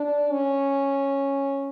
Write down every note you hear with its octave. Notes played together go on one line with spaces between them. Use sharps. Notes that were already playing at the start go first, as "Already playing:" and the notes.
Already playing: D4
C#4